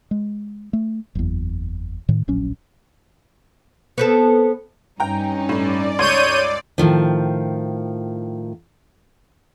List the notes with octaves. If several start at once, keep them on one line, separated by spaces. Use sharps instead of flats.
G#3
A3
F#1 E2
A2 D#3
D1 A#1 F#3 C#4
B3 C4 A4
G2 C#4 D#4 G5 A#5
A2 D5
C#2 C#5 C6 G6 G#6 D#7
A2 D#3 F3